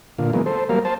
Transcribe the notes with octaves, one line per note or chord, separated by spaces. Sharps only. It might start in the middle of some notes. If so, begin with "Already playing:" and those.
A#2 D3 F4
E3 F#3 G#3 A#3 B3
A4 C5
F#3 G3 A#3 A#4 F5
C5 A5